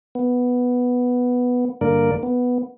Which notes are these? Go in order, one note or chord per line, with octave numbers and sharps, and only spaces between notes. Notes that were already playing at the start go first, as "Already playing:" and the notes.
B3
G2 D3 A#3 A#4 D5
B3